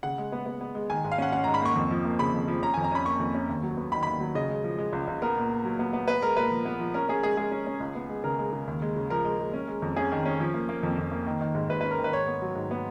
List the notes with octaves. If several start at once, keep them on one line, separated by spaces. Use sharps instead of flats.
C#3 F#5
G#3
B3
B3
B3
G#3
D#3 G#5
G#2
F5
C#4 F#5
C#4 F#5
G#2 A#5
B5
A#3 C#6
F2
F3
A#3
C#3 B5
F2
F3
C#4 A#5
F2 G#5
A#5
C#4 B5
A#3 C#6
F2
C#4
D#2
F#3
B3
D#3 B5
D#2 B5
F#3
C#3 D#5
G#3
F3
G#3
C#2
C#2
B3 A#4
A#2
A#2
F#3
B3
B3
B3 B4
G#3 A#4
A#2 B4
F3
B3
F3
C#4 A#4
C#4 G#4
G#3 G#4
G#3 G#4
C#4
C#4
C#2
B3
G#3
C#3 A#4
G#3
C#3
D#2
G#3
C#3
F3 A#4
G#3
G#3
C#4
G#3
F2
C#4 G#4
D#3
C#4
F3
A#3
A#3
F2
F2
A#3
D#3
D#3
G#2
G#2 B4
C#4 B4
A#4
D#3
B4
G#2 C#5
B3
F#3
G#2
B3